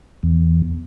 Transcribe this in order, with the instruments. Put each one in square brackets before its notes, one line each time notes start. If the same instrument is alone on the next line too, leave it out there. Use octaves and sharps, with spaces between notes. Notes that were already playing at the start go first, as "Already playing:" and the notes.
[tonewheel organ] E2